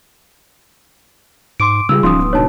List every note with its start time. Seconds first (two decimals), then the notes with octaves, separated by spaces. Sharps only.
1.60 G#2 C6 D6 D7
1.89 C#3 G3 F4 G#4 E6
2.03 D1 D#3 F3 C#4 C6 D#6
2.19 B3
2.33 G#2 B2 D3 C#5 A5